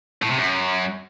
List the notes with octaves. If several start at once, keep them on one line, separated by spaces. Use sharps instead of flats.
A2
C3
F#2